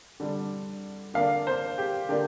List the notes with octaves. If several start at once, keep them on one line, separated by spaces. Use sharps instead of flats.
D3 G3 D4
D3 A#3 D4 F5
C5
G4
D3 A#3 D4 G4